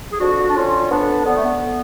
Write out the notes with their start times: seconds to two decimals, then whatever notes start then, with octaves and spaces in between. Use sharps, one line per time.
0.11 G#4
0.20 F2 D4 F#4
0.48 D4
0.56 D3 C#4 F4
0.90 F2 B3 D4
1.25 D3 B3
1.35 A3
1.43 B3